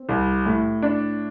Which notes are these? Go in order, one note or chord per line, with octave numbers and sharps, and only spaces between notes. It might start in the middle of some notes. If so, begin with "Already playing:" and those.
Already playing: C4
C2
A2
D4